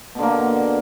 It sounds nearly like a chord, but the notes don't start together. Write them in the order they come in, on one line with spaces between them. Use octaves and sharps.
B2 D3 A#3